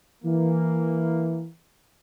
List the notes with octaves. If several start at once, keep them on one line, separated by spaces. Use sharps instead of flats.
E3 A#3